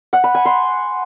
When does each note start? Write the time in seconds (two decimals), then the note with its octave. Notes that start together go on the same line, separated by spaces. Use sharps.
0.13 F#5
0.24 B5
0.35 G#5
0.45 C6